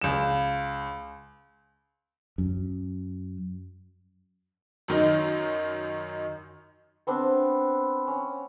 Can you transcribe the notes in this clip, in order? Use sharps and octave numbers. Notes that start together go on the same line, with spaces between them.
C#2 E7
F#2
F#2 D#3 D#4
B3 C4 D4
C#4